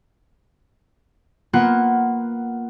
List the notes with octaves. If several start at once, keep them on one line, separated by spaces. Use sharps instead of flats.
A#3 B3 F4 F#5